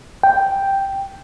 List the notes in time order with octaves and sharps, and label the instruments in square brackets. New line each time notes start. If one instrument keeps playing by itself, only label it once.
[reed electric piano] G5